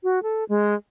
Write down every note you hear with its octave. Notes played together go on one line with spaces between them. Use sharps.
F#4
A4
G#3